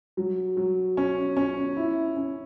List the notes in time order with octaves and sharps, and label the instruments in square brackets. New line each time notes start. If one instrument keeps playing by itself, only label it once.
[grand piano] F#3
F#3
C#4
C#4
E4
C#4